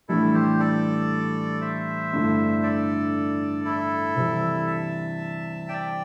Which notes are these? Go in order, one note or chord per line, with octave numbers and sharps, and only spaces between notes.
A2 E3 G3 D4 E4 A4
G4 C5
A4 D5
C5 E5
G2 D3 A3 E4
A4 D5
E4 A4
C3 E3 G3
E5 A5
D5 G5